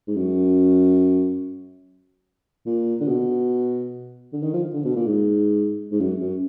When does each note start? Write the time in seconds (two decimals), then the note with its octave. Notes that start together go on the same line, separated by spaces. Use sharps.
0.07 G#2
0.16 F#2
2.66 A#2
3.00 D3
3.08 B2
4.33 D3
4.43 D#3
4.54 F3
4.74 D3
4.85 B2
4.96 A#2
5.06 G#2
5.92 G#2
6.00 F#2
6.20 F#2